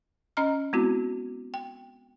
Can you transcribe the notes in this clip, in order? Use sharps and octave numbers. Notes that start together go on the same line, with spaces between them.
C#4 D#5 A#5 F6
G#3 B3 C4 E4 F#4
G5